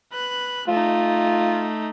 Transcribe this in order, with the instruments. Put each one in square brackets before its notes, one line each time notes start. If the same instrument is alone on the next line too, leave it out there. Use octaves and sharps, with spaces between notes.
[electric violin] B4 F#6
[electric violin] A3 D#4 [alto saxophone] F4